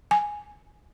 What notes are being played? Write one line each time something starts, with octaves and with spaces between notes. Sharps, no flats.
G#5